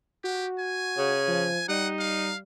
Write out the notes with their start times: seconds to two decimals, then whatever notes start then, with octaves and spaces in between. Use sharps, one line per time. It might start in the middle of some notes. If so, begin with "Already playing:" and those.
0.24 F#4 G4
0.59 G#5
0.97 C#3
1.28 F3
1.68 G3 D#4 F#5
1.99 F5